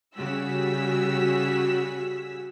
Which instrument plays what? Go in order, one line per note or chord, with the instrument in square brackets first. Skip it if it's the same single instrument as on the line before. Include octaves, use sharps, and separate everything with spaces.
[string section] C#3 G3 F#4 G#4 E6 B6